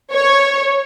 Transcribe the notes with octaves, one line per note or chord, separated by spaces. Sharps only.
C#5